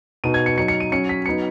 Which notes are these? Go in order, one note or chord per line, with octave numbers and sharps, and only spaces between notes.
B2 B3 D#4 D#7
G#6
C#7
F#3 D#4 C#7
C#7
D#7
F#3 C#4 C#7
B6
F#3 B3 D#4 C#7